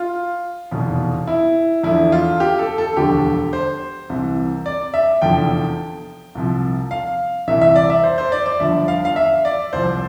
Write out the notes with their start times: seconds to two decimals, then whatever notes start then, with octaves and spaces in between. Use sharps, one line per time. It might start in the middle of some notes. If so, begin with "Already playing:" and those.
Already playing: F4
0.71 F1 E2 B2
1.27 E4
1.84 E2 D3 F3 E4
2.12 F4
2.40 G4
2.59 A4
2.78 A4
2.97 E1 D2 D3 F3 G4
3.53 C5
4.09 C2 C3 E3
4.66 D5
4.94 E5
5.22 F1 E2 D3 F3 G5
6.35 C2 C3 F3
6.91 F5
7.48 C2 C3 E3 E5
7.61 E5
7.76 D5
7.90 E5
8.03 C5
8.18 C5
8.32 D5
8.46 D5
8.60 G1 G2 F3 E5
8.88 F5
9.05 F5
9.16 E5
9.45 D5
9.73 C2 C3 F3 C5